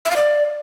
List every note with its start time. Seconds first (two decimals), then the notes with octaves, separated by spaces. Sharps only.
0.05 E5
0.11 F5
0.16 D5